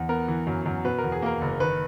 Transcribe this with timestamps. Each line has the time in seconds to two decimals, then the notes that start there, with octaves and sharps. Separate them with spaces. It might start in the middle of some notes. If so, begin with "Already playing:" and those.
Already playing: E2
0.09 B3 A#4
0.28 E3
0.47 F#2
0.66 F#2
0.85 B2 B4
0.98 A#4
1.04 E2
1.12 G#4
1.22 A#3 A#4
1.41 F#1
1.60 D#3 B4